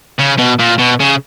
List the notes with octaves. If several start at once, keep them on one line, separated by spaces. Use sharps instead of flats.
C#3
B2
A#2
B2
C#3